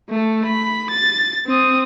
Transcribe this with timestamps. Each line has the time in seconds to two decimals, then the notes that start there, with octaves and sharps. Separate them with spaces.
0.10 A3 A4
0.46 B5
0.90 A6
1.47 C4 D#6